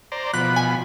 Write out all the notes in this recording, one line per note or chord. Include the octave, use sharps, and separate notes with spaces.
C5 D5 A#5
B2 F3 B5 F#6
G#5